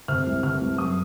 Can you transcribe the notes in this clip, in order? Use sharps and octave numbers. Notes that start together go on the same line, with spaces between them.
C3 F6
C2
C3 F6
C2
F#2 D#6